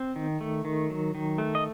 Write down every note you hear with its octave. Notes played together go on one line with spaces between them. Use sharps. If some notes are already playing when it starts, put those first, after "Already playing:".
Already playing: C4
D#3
A3
D#3
F#3
D#3
A3
D#5